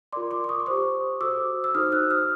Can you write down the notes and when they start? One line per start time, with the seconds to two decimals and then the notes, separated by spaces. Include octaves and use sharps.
0.13 F4 A#4 D5 C6 D6
0.31 C6 D6
0.44 D6
0.49 C#6 D#6
0.60 D6
0.66 G4 C5 C#6 D#6
1.21 F#4 A4 C5 D6 E6
1.64 E6
1.75 D#4 F#4 A4 C5 D#6 F6
1.92 E6 F#6
2.11 D#6 F6